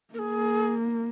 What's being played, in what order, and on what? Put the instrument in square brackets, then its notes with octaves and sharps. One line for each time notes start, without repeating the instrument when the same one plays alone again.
[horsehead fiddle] A#3 [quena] G#4 A#4